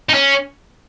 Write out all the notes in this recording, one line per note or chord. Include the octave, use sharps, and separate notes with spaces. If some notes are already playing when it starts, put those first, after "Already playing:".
D#4
C#4